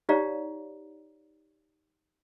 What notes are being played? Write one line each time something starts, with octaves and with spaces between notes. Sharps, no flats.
D#4 G4 C#5 D5 F5 A#5